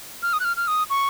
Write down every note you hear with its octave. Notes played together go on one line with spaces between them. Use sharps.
F6
D#6
F#6
F6
F6
D#6
C#6